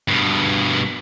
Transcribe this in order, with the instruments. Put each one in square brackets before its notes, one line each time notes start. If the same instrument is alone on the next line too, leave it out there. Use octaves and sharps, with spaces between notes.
[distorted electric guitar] G2 B2